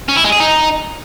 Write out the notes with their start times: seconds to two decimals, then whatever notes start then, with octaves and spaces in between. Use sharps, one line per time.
0.09 C#4
0.17 E4
0.25 G#3
0.33 G#4
0.40 D#4